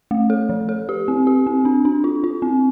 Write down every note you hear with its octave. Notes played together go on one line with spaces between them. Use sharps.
A3
A4
F3
A4
G4
C4
G4
C4
D4
D4
F4
F4
C4